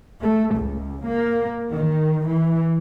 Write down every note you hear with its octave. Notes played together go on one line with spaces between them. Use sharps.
A3
C#2
A#3
D#3
E3